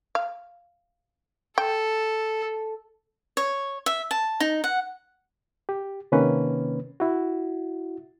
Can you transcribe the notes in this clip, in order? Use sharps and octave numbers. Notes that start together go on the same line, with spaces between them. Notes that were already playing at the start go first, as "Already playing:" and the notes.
F5
A4 G5
C#5
E5
A5
D#4
F#5
G4
C3 D#3 A#3 C#4 B4
E4 F#4